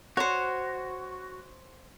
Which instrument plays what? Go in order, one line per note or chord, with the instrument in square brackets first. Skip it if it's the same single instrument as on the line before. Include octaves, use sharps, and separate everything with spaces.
[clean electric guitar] F#4 [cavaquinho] C5 C#5